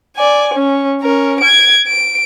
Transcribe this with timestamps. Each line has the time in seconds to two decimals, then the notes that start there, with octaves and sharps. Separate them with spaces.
0.16 D5 G#5
0.54 C#4
1.01 C#4 A#4
1.40 G#6 D7
1.87 D7